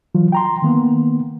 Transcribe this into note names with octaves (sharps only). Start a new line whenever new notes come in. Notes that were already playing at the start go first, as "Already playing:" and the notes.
E3 F#3 F4
G5 A#5 C6
D#3 A#3 B3